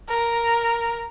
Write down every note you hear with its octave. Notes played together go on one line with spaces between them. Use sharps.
A#4